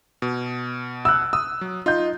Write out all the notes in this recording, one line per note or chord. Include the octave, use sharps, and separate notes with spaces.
B2
E6 F#6
D#6 E6
F#3
D#4 F4 G6